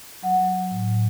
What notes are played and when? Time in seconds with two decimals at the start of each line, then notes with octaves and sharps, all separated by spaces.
0.23 F#3 F#5
0.39 F#3
0.55 F#3
0.71 A2
0.87 A2